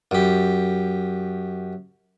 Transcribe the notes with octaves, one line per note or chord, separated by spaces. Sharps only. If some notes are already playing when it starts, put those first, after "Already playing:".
F#2 G4